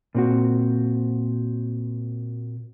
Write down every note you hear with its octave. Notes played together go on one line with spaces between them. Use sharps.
A#2 C4 F#4